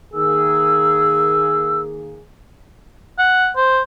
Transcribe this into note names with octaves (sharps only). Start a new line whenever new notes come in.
D#3 A#3 G#4 E6
F#5
C5